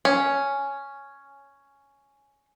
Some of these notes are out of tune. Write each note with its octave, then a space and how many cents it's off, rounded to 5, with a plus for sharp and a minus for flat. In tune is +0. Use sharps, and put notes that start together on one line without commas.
C#4 +5